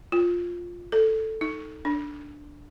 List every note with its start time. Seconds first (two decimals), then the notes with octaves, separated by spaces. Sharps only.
0.12 F4
0.92 A4
1.41 D#4
1.85 D4